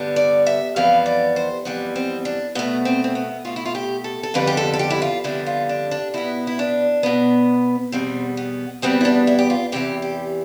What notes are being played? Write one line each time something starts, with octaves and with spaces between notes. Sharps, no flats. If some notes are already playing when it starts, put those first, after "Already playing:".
Already playing: G2 D3 G3 B3
D5
E5
F2 E3 G3 B3 F5
D5
C5
F2 E3 G3 B3 D4
C4
D4
B2 A3 B3
C4
C4
B3
B2 A3 F4
E4
F4
G4
A4
A4
F2 D3 G3 B3 B4
G4
A4
A4
G4
E4
F4
F2 D3 G3 B3 E4
F4
D4
D4
B2 B3 E4
E4
D4
B2 B3
E2 B2 G3 B3 C4
B3
E2 B2 G3 B3 C4
E4
D4
E4
G4
F4
E2 C3 E3 G4
G4